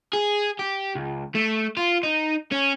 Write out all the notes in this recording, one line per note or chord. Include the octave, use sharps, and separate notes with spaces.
G#4
G4
C#2
A3
F4
D#4
C#4